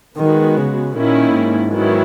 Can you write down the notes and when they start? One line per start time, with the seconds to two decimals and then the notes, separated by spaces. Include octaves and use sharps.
0.17 D#3 G#3 B3 F#4
0.57 C#3
0.94 A#2 D#3 A#3 C#4 E4
1.32 G#2
1.70 D#3 F#3 B3 E4